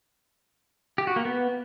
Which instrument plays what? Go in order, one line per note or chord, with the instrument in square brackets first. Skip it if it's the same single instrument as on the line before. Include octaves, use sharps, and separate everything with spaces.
[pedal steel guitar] G4
F#4
A#3
B3